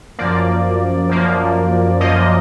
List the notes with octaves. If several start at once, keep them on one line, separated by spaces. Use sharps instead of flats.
F#2 F3 A#3 D5
F#2 F3 A#3
F#2 F3 A#3 D#5